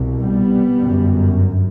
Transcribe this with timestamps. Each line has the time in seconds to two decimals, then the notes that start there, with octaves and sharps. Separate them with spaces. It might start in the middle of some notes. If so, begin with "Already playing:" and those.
Already playing: C2 B2
0.22 G3 B3
0.79 G1 F#2